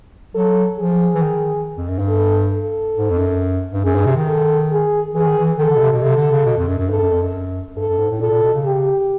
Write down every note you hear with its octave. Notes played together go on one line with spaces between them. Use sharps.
F#3 A4
F3 G#4
E3
D#3
F2
F#2
G2
A4
A4
G#2
F2
F#2
G2
F#2 G#4
G2
C3
D#3
A4
G#4
E3 G#4
D#3
E3
D#3 A4
D3
B2
C3
B2
C3 A4
D3
C#3
B2
F2
F#2
F#2
G2 A4
F#2
F2
F#2
G2 A4
F#2
G#2
A2
A#2 A4
A#2
B2
C#3
G4